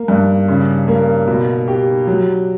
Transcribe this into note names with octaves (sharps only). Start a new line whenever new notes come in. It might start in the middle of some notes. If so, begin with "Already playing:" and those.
Already playing: A#3
G2
C#3
A#3
B2
G4
F#3